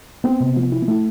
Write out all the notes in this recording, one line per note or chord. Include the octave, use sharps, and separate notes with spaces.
B3 C4
C3
F3
E4
B3
A3 E4